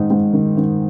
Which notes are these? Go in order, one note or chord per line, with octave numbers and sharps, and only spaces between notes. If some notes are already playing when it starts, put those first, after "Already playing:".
Already playing: G#2 D#3 D#4
G#2
D#3
D#3